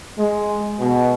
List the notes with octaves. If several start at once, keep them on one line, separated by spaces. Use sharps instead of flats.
G#3
B2